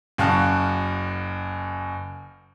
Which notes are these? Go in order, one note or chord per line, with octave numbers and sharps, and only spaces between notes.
F#1 F#2 F5 A5 C#6 F#6